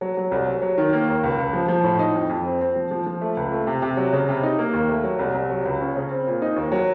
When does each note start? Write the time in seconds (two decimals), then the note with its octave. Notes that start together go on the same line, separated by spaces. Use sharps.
0.01 F#3
0.17 F#3
0.31 C2
0.47 F#3
0.62 F#3
0.78 D#3
0.93 A#3
1.08 D#2
1.23 C#2
1.38 C#2
1.53 F3
1.68 F3
1.84 A2
1.99 D#4
2.14 F2
2.29 F2
2.45 C4
2.61 C4
2.76 F3
2.91 F3
3.06 F3
3.21 A3
3.37 C#2
3.52 A3
3.67 C3
3.82 C3
3.97 F#3
4.13 C#3
4.29 C3
4.43 D#4
4.59 A#3
4.73 D#2
4.89 A3
5.04 F#3
5.19 C2
5.34 C2
5.50 F#3
5.65 C#2
5.81 C#4
5.96 C#3
6.10 C4
6.27 A#2
6.42 D#4
6.56 D#2
6.72 F#3